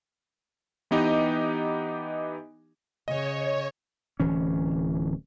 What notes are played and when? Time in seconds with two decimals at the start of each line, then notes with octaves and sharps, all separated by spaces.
0.91 E3 B3 D#4 G4 D#5
3.08 C#3 C#5 D#5
4.20 D1 E3 C#4